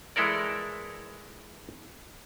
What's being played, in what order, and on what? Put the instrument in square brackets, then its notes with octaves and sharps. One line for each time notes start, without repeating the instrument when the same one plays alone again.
[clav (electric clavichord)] E3 G#3 E4 A4 A#4 D5